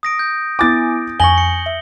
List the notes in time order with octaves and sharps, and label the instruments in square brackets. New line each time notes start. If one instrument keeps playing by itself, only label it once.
[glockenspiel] D#6 A#6 D7
G6
[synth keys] B3 E4 G#5 [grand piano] D6 A6
[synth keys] F2 [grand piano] G#5 C#6 [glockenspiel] A#6 F#7 G7
[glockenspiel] C#7
[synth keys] E5